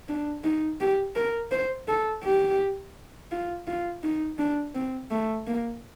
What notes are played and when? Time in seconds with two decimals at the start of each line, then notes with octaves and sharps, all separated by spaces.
0.09 D4
0.44 D#4
0.80 G4
1.16 A#4
1.52 C5
1.88 A4
2.23 G4
3.31 F4
3.67 F4
4.03 D#4
4.39 D4
4.75 C4
5.11 A3
5.47 A#3